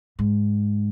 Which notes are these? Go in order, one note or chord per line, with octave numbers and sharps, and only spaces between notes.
G#2